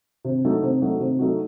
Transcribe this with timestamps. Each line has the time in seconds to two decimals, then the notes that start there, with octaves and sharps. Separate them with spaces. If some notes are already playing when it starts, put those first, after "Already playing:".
0.25 C3
0.45 F#3 A3 D#4 F#4
0.63 C3
0.82 F#3 A3 D#4 F#4
1.00 C3
1.19 F#3 A3 D#4 F#4